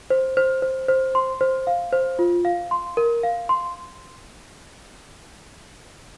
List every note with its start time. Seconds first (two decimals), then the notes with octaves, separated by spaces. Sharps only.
0.10 C5
0.37 C5
0.62 C5
0.88 C5
1.15 C6
1.41 C5
1.67 F5
1.93 C5
2.19 F4
2.45 F5
2.71 C6
2.97 A#4
3.23 F5
3.49 C6